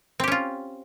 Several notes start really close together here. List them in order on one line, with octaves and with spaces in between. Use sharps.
C4 G4 C#4 F4